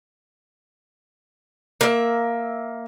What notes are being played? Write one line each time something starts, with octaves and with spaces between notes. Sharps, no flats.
A#3 E5